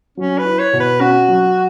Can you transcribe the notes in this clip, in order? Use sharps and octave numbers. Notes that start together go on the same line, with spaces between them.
F#3 C#4
B4
E4
C#5
B2
B4
C#4 F#4
F#3